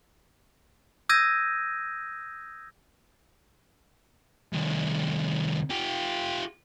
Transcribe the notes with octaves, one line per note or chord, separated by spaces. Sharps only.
D#6 E6 G6 G#6 A#6 D#7
C2 D#3
F4 G4